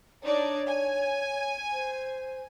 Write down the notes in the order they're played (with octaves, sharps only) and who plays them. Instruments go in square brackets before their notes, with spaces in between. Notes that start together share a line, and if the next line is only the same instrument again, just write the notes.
[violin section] D4 D#4 D5 [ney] C#5
[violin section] G#5
[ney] C5